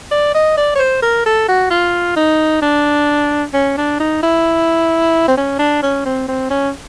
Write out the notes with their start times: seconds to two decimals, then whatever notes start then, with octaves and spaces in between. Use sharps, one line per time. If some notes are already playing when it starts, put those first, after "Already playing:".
0.11 D5
0.34 D#5
0.57 D5
0.75 C#5
0.79 C5
1.02 A#4
1.26 A4
1.48 F#4
1.70 F4
2.16 D#4
2.62 D4
3.53 C#4
3.77 D4
4.00 D#4
4.23 E4
5.28 C4
5.37 C#4
5.59 D4
5.83 C#4
6.05 C4
6.28 C4
6.50 C#4